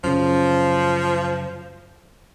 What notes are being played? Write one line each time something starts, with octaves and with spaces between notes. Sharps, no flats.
F#2 C#3 F3